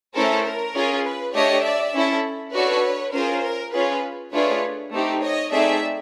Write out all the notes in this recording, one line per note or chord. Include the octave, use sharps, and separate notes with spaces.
A3 C#4 E4 A4 A#4 C5
A#4
C#4 F4 G#4
B4
A3 D4 G4 C#5 D#5
D5 E5
C#4 E4 A4
D4 F#4 A4 B4 C#5
C#4 F4 G#4 A#4 C5
A#4
C#4 F4 G#4 B4
A3 D4 F4 G#4 B4 C#5
A3 C4 D#4 G4
C#5 D#5
A3 C4 D#4 G#4 D5 E5